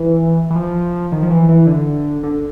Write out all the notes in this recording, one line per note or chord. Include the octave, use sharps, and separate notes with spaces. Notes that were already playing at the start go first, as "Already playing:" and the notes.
Already playing: E3
E3
F3
D#3
F3
E3
E3
D3
D3